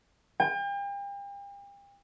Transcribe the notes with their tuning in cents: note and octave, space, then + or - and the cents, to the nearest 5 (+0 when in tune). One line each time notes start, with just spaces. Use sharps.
G5 +40